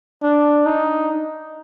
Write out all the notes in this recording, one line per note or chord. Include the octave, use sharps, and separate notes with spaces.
D4
D#4